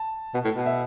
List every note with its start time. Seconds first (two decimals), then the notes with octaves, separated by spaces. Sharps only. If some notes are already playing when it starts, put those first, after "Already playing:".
Already playing: A5
0.34 B2
0.44 A2
0.55 B2
0.66 E5